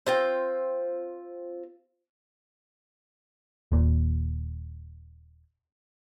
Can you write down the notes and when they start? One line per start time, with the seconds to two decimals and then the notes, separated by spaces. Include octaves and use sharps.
0.07 C4 F4 G5
3.72 D#1 A#2